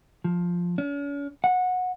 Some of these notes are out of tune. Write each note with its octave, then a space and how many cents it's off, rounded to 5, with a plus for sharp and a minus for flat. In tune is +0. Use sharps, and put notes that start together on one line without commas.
F3 +5
C#4 +45
F#5 -20